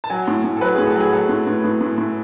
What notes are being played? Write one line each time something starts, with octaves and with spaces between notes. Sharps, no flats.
A5
F#3 G#5
A2
A2
A4
F#3 B4
G#4
A2
A4
F#3 G#4
F#3 A4
A2
A2
A2
A2
A2